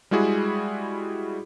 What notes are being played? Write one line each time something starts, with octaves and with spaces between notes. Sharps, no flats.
G3 G#3 E4 F#4 G#4